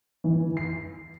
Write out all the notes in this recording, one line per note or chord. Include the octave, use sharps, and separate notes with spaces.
E3
C7